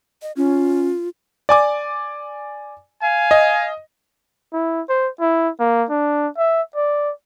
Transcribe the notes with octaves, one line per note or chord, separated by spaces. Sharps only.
D#5
C#4 F4
D5 G#5 D6
F5 G#5
D#5
E4
C5
E4
A#3
D4
E5
D5